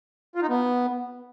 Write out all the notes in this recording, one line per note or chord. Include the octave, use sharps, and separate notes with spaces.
F4
D#4
B3